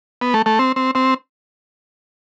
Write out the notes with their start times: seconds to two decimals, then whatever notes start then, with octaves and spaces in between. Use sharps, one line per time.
0.21 B3
0.34 A3
0.46 A3
0.59 C4
0.76 C4
0.95 C4